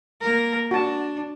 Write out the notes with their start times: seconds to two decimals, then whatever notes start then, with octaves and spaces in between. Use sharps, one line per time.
0.21 A#3 A#4
0.71 D4 F#4 A5